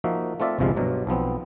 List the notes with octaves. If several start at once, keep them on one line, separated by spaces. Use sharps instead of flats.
F3 A#3 D#4 F#4 E5
A3 C4 F4 D5 E5
G1 C2 C3 F3 G#3 F5
G2 B2 F#3
B1 F3 B3 C4